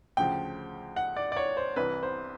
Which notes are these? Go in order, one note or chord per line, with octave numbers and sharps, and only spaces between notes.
D2 C#3 F3 G5
F#5
D5
D5
C#5
C5
C2 C3 E3 B4
C5